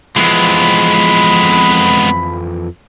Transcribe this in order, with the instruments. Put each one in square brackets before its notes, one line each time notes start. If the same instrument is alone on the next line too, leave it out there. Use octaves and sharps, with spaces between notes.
[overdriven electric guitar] F2 E3 [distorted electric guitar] G#3 B3 [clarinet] B5